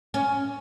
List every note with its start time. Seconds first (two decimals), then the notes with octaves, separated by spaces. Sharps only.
0.14 C#4